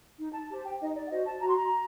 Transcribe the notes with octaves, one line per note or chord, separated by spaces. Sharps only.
D#4
A5
G4 C5 A5
G5
D#4 D#5
D5
F#5
F#4 C5 D#5
A5
F#4 A#5
C6
A#5